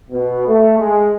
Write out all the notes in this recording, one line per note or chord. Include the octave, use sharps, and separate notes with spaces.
B2
A3
G#3